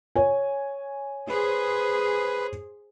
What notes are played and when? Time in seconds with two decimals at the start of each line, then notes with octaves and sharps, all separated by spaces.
0.16 C#5 G#5
1.29 G#4 B4 C5